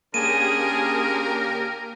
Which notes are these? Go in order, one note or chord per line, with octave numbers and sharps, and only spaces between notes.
D3 A#3 C#4 G4 G#4 A#4 D#7